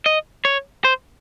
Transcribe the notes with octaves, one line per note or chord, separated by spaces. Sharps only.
D#5
C#5
C5